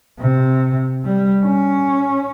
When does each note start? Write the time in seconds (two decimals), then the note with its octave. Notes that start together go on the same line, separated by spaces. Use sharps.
0.19 C3
1.04 G3
1.45 C#4